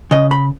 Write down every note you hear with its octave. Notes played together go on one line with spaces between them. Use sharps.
C#3 D#5
B5